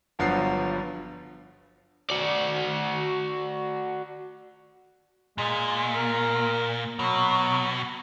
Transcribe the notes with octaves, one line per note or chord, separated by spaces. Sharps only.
G1 G2 F3 F#3 B3 C7
F#4 D5
A#2 G#3
A#4
B2 F#3